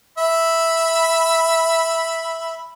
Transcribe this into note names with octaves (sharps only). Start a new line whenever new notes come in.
E5 B5